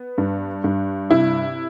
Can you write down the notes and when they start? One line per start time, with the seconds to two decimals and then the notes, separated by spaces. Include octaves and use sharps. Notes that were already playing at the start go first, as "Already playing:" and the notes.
Already playing: B3
0.18 G2
0.64 G2
1.10 C3 E4